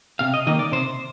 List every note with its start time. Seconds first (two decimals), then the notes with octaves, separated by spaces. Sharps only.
0.19 C3 F5
0.34 D#5
0.47 D#3 A#3 D#5
0.59 D5
0.72 C3 C5